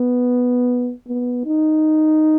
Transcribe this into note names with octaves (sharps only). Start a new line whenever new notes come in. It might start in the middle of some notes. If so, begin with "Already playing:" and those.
Already playing: B3
B3
D#4